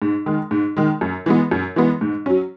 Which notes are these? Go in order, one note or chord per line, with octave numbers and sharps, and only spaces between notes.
G#2
D#3 G#3
G#2
D#3 G#3
F#2
E3 G#3 B3
F#2
E3 G#3 B3
G#2
F#3 C#4